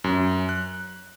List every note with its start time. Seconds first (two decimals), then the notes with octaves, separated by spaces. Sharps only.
0.04 F#2
0.49 F#6